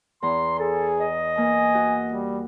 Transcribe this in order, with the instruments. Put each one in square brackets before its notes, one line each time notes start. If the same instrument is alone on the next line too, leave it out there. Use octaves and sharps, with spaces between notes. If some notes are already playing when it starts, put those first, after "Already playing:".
[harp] E2 A#5 [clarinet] C6
[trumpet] G#4 [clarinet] A4
[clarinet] D#5
[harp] A#3 [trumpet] G#5
[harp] F#4
[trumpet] G3